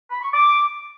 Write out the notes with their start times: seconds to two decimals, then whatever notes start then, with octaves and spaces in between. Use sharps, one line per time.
0.11 B5
0.22 C#6
0.33 D6